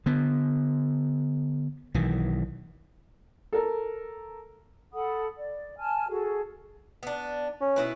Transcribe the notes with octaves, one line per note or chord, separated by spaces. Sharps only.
D3 B3
B1 D#3 E3
A4 A#4
A4 F#5 B5 D#6
D5
G#5 A5 F6
F#4 G#4 A4
B3 D4
C#4
B2 E4 B4